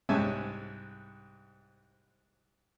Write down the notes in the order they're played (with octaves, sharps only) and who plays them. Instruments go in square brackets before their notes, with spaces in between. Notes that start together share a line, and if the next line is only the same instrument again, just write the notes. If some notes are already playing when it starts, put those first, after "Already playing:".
[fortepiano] C2 G#2 C#4 E5 G#5 A5